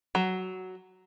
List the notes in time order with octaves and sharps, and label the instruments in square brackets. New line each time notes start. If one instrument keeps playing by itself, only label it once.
[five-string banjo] F#3